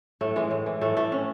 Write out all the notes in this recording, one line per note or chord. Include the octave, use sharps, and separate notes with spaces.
A2 A3
E3 G#3
A2
E3
A2 A3
E3 A3
A2 C#4